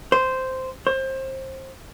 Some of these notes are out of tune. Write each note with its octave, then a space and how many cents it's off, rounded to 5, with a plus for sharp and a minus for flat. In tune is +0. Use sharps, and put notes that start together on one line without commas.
C5 -10
C5 +25